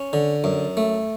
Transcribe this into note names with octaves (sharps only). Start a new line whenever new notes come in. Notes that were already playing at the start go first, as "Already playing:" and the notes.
Already playing: C#4
D3
F#2
A3